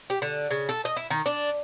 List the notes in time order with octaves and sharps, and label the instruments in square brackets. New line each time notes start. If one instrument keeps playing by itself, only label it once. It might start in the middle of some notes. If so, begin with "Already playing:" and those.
[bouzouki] G4
D3
C#3
A4
D#5
E4
D#3
D4